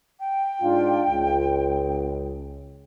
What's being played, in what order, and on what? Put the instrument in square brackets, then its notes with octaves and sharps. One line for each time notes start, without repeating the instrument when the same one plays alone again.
[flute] G5
[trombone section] G#2 D4 F4
C#2